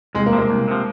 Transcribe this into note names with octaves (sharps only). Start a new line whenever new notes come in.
C2 G#3
A#3
C3 F3
A#3
C2
C3 F3